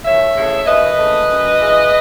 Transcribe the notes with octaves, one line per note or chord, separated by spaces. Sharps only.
D#2 C#5 E5
C#3 E3 A3
D#2 B4 D#5
C#3 E3 A3
F#2
E3 G#3